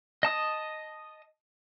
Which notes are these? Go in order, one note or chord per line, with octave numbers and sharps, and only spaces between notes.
D#5 A5 D#6